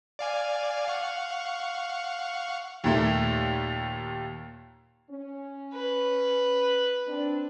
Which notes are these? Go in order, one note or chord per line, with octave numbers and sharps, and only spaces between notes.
D5 F5 G#5
F5 F#5 C#6
D#2 A#2 A3
C#4
B4
C4 D4